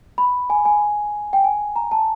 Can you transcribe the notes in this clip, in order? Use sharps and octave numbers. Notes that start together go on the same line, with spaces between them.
B5
G#5
G#5
G5
G#5
A#5
A5